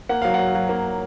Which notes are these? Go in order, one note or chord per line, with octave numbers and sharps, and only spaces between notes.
A#3 F#5
F#3 F5
F#5
F#3
F#3
A#3